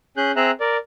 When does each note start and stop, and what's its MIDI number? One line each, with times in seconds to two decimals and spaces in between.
0.17 0.32 61
0.17 0.32 68
0.17 0.32 90
0.17 0.32 91
0.36 0.51 60
0.36 0.51 68
0.36 0.51 76
0.36 0.51 82
0.36 0.51 90
0.60 0.77 70
0.60 0.77 74